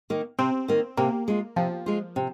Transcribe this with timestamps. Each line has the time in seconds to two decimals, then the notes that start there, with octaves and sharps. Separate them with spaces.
0.10 D#3 A#3
0.39 C3 C4
0.68 D#3 A#3
0.97 C3 A#3
1.28 G#3 F4
1.56 C3 F3
1.86 G#3 F4
2.16 C3